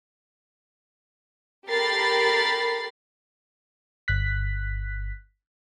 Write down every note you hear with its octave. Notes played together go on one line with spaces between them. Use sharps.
G4 A4 A#4 B5 A6 C7
G1 F#6 B6